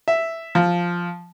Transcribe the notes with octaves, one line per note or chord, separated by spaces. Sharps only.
E5
F3